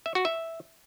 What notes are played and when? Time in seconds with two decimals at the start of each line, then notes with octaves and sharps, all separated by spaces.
0.06 E5
0.15 F#4
0.25 E5